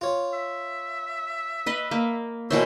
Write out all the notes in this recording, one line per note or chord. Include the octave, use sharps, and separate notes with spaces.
F4 C#5
E5
B4 D#5
A#3
B2 E3 F#4 A#4 C5 C#5 E5